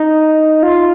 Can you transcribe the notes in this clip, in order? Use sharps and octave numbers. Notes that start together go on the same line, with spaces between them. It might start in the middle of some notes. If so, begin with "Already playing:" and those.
Already playing: D#4
F4